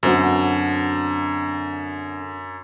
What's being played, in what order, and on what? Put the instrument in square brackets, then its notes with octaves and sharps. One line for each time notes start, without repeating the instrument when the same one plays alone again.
[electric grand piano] F#2 [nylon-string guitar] D3 C4 F#4